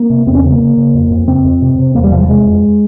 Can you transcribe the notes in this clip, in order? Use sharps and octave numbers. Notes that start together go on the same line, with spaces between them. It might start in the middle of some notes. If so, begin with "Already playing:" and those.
Already playing: A#3
C3
E2 C4
C#4
C#3 C4
A#3
C#3
C#3
F2
F2
C#3 C4
F2
C3
C3
E2 A#3
G3
C3 F3
G3
C3 G#3
F2